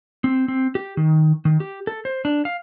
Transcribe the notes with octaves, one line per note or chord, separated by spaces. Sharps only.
C4
C4
G4
D#3
D#3
G4
A4
C5
D4
F5